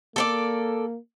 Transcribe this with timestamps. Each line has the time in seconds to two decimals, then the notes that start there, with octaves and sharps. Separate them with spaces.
0.16 A#3 A4 C5 D5